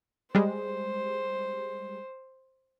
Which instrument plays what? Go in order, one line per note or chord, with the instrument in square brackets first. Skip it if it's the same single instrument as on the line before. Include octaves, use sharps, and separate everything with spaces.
[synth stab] G3 G#3 [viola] C5